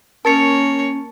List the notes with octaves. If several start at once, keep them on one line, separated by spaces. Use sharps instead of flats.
A#3 C#4 A#4 C#5 A5 A6 C#7